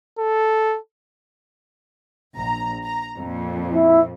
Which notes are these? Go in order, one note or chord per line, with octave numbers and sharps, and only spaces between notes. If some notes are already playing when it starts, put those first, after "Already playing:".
A4
A#1 A#5
A#5
F2 A#2
E4